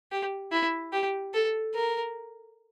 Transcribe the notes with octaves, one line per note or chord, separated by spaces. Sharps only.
G4
E4
G4
A4
A#4